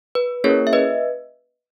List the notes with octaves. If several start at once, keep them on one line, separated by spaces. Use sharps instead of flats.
B4
A#3 C#4 E4 G#4 A#4 C#5
E5
B4 D#5